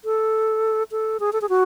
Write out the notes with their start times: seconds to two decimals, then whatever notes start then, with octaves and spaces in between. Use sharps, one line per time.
0.05 A4
0.91 A4
1.20 G#4
1.33 A4
1.42 G#4
1.49 F#4